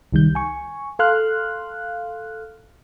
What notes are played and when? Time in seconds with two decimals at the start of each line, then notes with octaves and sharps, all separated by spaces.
0.12 C2 D#3 G3 G6
0.35 G#5 C#6
0.99 A4 F5 C6 F6 F#6